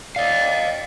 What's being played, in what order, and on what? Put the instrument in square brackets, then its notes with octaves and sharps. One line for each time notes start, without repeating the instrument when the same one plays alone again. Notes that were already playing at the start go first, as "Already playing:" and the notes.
[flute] D5 [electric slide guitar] D#5 F5